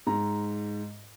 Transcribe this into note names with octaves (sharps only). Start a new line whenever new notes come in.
G#2 A#5